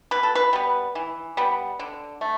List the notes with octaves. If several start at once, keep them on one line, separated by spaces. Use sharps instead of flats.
B2 B4
A4
B4
G3 B3
E3
G3 B3
D3
A3